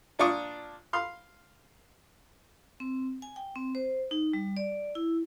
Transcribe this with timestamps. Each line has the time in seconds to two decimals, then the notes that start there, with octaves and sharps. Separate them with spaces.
0.19 A#2 D4 F4 C#6 D#6
0.93 F5 C6
2.80 C4
3.22 G#5
3.36 G5
3.56 C4
3.75 C5
4.11 D#4
4.33 G3
4.57 D5
4.95 E4